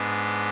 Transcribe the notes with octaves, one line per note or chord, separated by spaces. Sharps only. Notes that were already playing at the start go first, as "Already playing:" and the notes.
Already playing: G#2 G#3 B3 D4